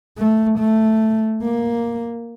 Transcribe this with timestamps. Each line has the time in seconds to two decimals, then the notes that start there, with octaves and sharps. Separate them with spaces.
0.18 A3
0.59 A3
1.42 A#3